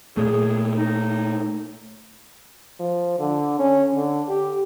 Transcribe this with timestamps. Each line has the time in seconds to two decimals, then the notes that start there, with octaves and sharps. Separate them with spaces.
0.17 A#2 A3 G#4
0.77 D#4
2.80 F3
3.19 D3
3.59 C#4
3.95 D3
4.28 G4